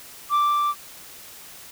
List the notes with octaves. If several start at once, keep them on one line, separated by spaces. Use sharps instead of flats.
D6